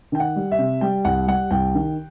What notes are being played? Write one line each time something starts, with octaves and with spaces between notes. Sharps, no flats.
D#3 G5
F#5
G3
E5
C3
G3 G5
C2 F#5
G3 F#5
C2 G5
D#3